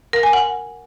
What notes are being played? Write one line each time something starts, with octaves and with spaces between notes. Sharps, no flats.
A#4
G#5
F#5